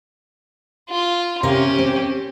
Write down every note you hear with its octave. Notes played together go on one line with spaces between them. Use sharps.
F4
C3 C#4 G4 A#4 F5
C4